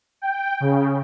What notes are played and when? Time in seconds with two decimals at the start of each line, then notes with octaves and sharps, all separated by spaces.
0.22 G5
0.60 C#3